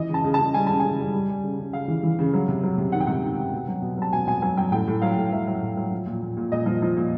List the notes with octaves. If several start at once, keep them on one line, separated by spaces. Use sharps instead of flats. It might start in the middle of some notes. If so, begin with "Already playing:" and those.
Already playing: E3 D#5
C#3 A5
C#3
A5
C#3
G3 G#5
C#3 A5
C#3 G#5
G3
G3
G3
C#3
C#3
C#3 F5
E3
E3
C#3
F#3
C3
F#3
C3
D#3 F#5
G5
C3 F#5
D#3
C3
B2
F#3
B2
F#3 A5
B2 G#5
B2 G#5
F#3 G#5
F#3 G5
A2 G5
A2
F#3 F5
A2
F#3 E5
F#3
A2
F#3
F3
A#2
A#2
A#2
A#2 D#5
F3
F3
A#2